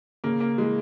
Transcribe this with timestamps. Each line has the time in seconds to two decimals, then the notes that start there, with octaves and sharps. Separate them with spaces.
0.24 C#3 A#3
0.40 A#3
0.57 E3 G#3